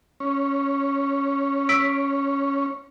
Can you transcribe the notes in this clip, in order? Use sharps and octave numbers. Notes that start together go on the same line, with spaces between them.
C#4
E6 B6 D7